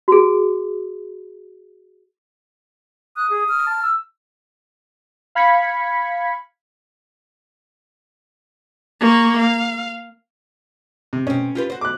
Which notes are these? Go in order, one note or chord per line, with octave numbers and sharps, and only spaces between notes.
F#4 G#4
D#6 F#6
G#4
F6
A5
E6
F5 B5 G#6 B6 C#7
A#3 C#6
F5
C3
B2 C4 C#4
F4 G4 B4
F#4 C5
D6 F#6